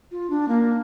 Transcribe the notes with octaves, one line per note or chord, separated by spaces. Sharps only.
F4
D4
A#3